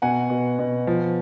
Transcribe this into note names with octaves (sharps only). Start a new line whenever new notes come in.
B2 F#5 G#5
B2
B2
F3